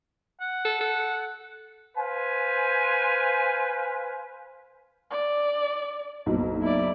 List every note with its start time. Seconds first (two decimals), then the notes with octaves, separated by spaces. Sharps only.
0.41 F#5
0.65 A4
0.81 A4
1.97 B4 C5 F5 G#5
5.11 D5
6.26 F#1 B1
6.62 E4 D5